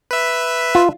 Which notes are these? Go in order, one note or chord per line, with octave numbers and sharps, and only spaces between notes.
B4 E5
F4